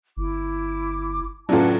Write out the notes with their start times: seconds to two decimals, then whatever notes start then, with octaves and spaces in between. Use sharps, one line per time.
0.17 G1 E4 D6
1.49 A2 C#3 F#3 D4 F4 B4 F#5 A5